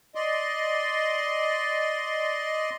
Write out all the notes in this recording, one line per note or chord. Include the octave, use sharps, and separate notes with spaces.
D5 D#5 C6